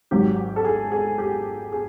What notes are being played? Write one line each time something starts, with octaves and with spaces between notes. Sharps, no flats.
G#1 G#2 D#3 F#3 G4
A4
G#4
G#4
G4
G#4